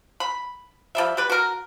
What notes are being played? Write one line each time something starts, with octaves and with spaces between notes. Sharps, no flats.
B5
F3 G3 E5
G3 G4 B4
F#4 A#4